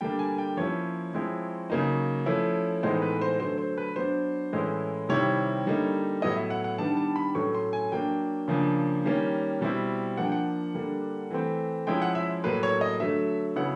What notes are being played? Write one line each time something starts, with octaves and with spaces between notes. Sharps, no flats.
D3 G3 A#3 D4 G5
G#5
G5
F3 A#3 C#4 E4 C#5
F3 G#3 C4 E4
C#3 F#3 A#3 D#4
F3 A3 C#4 E4
A2 E3 G#3 B3 D#4 C5
B4
C5
D3 F#3 A3 C5
C5
B4
F#3 B3 D4 C5
A2 E3 G#3 C#4 E4
C3 D#3 G3 C4 E4 C#5
D3 G3 A#3 D#4
A2 F#3 B3 E4 D#5
E5
F#5
F#5
D#3 G3 B3 D4 A5
A5
B5
A2 F#3 A3 C#4 C#6
C6
G#5
F#3 A#3 D4 G5
C#3 F3 A#3 D4
D#3 G3 A#3 C#4
B2 G3 C4 E4
F3 A#3 D4 F#5
G5
F#5
D3 G3 A#3 D4
E3 A3 C4
F3 G#3 C#4 E4 G5
F#5
E5
A2 F#3 A#3 B4
C#5
D#5
D3 F#3 A3 E5
C#3 F#3 B3 E4 F#5